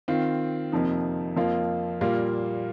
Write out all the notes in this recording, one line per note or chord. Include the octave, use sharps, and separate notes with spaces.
D#3 C4 F4
F2 C3 F3 A#3 D#4
F2 F3 A#3 F4
A#2 G3 A#3 F4